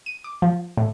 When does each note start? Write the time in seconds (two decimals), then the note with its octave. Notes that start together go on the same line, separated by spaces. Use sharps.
0.06 D#7
0.24 D6
0.42 F3
0.77 A2